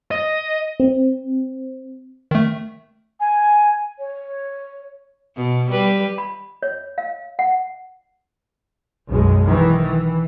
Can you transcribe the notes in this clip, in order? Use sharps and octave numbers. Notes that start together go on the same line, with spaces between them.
D#5
C4
D#3 A3
G#5
C#5
B2
G3 B4
B5
C#5
F5
F#5
B1 F#2 G#3
D#3 E3
E3